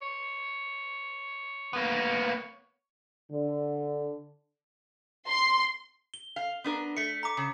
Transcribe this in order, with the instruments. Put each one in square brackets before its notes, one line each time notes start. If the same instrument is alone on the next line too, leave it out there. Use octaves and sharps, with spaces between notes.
[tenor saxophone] C#5
[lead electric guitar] A#3 B3
[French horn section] D3
[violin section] C6
[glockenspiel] G7
[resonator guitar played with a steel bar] F5
B3 D4 A#4
[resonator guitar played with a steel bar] A3 [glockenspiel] B6 C#7
[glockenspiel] A#5 D6
[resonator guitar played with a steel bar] C#3